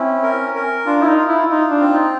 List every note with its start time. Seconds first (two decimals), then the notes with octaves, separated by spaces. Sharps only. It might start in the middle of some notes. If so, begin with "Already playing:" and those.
Already playing: C4 C#4 E4
0.23 A#4
0.55 A#4
0.86 D4 F4
1.02 E4
1.07 D#4
1.18 F4
1.28 E4
1.49 D#4 F4
1.70 D4
1.80 C4
1.91 D#4